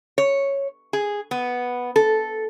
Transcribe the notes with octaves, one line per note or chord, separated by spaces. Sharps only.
C#5
G#4
B3
A4